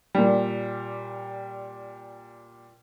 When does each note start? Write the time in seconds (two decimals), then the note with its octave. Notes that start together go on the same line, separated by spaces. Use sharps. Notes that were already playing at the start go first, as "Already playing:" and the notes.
0.15 A#2 G3